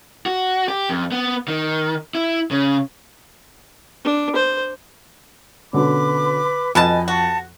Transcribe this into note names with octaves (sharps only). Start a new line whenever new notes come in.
F#4
G4
F2
B3
D#3
E4
C#3
D4
C5
B2 D3 C#4 B4 B5 D6
F2 B2 B4 D#5 G#5 A5
F#4 F#5 A5